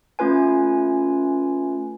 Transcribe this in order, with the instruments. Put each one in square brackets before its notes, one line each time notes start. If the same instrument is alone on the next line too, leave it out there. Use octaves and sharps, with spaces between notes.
[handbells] A3 C#4 F4 B4 G#5